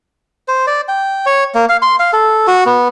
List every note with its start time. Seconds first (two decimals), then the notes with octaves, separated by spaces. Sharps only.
0.48 C5
0.67 D5
0.88 G5
1.26 C#5
1.55 A#3
1.69 F5
1.82 C6
1.99 F5
2.13 A4
2.47 F#4
2.66 B3